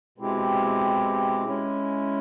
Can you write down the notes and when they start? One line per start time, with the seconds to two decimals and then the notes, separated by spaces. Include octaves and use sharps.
0.18 B2 G#3 C4 E4 G4
1.45 G#3 C#4 E4